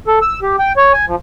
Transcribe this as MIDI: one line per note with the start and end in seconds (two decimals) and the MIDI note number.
0.07 0.19 69
0.22 0.39 88
0.43 0.56 67
0.59 0.73 79
0.77 0.92 73
0.93 1.05 80
1.07 1.16 53